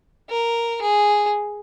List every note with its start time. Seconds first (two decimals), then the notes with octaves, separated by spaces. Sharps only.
0.30 A#4
0.81 G#4